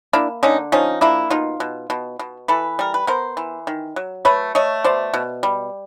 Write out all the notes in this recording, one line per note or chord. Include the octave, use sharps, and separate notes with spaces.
A#3 D4 E4
D3 C#4 D#4
F3 C#4 D#4
A#3 D4 E4
B2 D#4 F4
B2
B2
B2
E3 A4 B4
G3 A#4
B4
B3 A#4 C5
E3
D#3
F#3
A3 B4 C#5
A3 C#5 D#5
B2 C5 D5
B2
G3